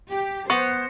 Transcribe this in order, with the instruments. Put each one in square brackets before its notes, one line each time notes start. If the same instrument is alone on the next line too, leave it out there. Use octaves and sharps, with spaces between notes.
[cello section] G4
[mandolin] B3 [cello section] C5 [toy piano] C#6 [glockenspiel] A#6 C#7